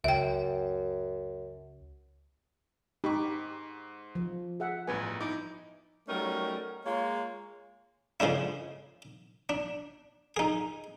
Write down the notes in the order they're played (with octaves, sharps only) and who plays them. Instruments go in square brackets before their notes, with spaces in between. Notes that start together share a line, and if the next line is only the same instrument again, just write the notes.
[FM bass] C#2 [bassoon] F#2 [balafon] E5 G5
[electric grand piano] G#2 C#6 [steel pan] D#4 G4 B5
[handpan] F3
[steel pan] G#4 E5 F#5
[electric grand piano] A1 G2 B3 [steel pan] B4 G#5
[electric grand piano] D#4 E4 [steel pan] D6
[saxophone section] F#3 G3 A3 C#4 D#4 A#4
G#3 A#3 F4 C#5
[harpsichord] C#3 F3 G#3 D4 E4
D4
D#4 G#4